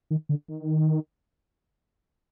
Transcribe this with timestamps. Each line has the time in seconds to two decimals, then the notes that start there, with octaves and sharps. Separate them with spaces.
0.11 D#3
0.29 D3
0.48 D#3